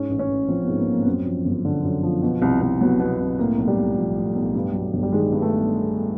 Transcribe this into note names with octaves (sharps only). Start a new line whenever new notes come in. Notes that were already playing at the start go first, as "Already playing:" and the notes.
Already playing: G#2 C#4
A1
C#4
A1
F3 C4
G#2 B3
A#3
A1 A#3
B3
F#2 C4
F3
G1
D3
F#2
F3
B2
C2
C2
F#3 B3
B2 B3
C2
A2 A#3
B1
G3
B1
F3
A2
B1
G2
F#3
G1
G3
D#3 G#3
G2
A3